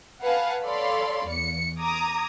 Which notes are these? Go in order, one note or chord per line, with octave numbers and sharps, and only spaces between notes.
B4 F5 F#5 G#5 A5
A4 C#5 D5 F5 B5 C6
E2 C#7
A#5 D6 D#6 G#6